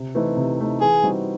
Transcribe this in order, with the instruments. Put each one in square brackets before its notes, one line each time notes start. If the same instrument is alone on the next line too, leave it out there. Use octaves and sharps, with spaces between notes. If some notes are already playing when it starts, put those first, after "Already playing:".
Already playing: [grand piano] C3
E3 A3 C4 D#4
C3
E3 A3 C4 D#4
[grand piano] E3 [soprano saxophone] G#4
[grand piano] G3 C4 D#4 F#4